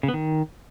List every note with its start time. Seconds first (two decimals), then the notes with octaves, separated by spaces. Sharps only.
0.03 C#3
0.08 B3
0.14 D#3